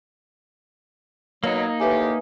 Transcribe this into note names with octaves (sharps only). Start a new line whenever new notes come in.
B2 F#3 A#3 D#4
A2 D#3 G4 B4 E5 G#5